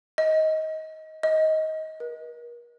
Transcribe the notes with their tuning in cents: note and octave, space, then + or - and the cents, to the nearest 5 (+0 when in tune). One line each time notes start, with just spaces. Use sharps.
D#5 +20
D#5 +20
A#4 +40